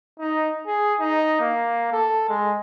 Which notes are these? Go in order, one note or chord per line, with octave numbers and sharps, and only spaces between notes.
D#4
G#4
D#4
A#3
A4
G#3